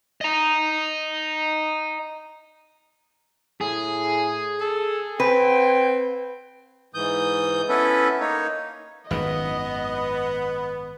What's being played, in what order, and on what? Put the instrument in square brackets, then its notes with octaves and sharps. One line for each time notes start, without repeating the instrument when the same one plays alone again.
[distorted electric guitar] D#5 A#5
[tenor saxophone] A2 [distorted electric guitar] G#4
[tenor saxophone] A4
[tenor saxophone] C4 [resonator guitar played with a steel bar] B4 [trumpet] G5
[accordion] G#2 E3 D#6 G6
B3 C#4 E4 A4 B4
A#3 D#4 C#5
[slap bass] G#1 F#2 D#3 [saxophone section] B3 [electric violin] D#5